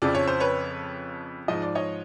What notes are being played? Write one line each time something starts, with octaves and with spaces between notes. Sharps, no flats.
F2 C#3 F3 D5
C#5
C5
B4 C#5
G#2 F3 D#5
D5
C#5 D#5